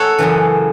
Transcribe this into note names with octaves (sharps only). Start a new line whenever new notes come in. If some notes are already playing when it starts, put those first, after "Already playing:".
Already playing: A4 C#5 F#5
F#2 C#3 E3